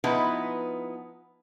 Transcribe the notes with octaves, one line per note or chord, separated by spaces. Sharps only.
F3 B3 D#4 E4 B4